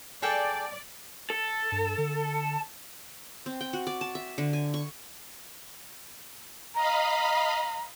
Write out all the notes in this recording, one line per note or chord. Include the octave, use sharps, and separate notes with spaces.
G#4 A4 D5 G5
A4
G2
D3
C4
G5
F#4
D5
A5
E5
D3
G#5
C#6
D#5 F5 A#5 B5